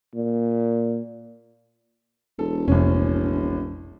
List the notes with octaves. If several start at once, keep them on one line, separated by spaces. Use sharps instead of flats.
A#2
E1 A4
F1 A#1 C#4